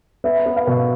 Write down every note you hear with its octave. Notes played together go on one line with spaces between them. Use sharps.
B3 E5
B3
F5
B2